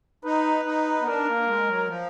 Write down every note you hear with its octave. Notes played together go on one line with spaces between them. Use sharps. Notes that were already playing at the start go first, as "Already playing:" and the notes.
D#4 B4
D#4
B3
D4 A#4
A#3
G#3
F#3
F3